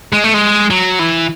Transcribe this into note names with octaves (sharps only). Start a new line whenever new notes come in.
G#3
A3
G#3
F#3
E3